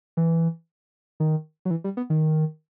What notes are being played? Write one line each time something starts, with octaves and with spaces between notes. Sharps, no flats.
E3
D#3
F#3
E3
G3
B3
D#3